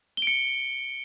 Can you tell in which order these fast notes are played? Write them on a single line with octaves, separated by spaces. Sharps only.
G7 D7 C#7